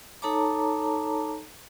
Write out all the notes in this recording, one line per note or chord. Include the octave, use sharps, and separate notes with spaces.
D#4 A4 C#5 A5 A#5 D6